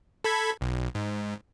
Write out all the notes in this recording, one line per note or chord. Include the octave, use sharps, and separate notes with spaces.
A4 B5 G#6
B1
G#2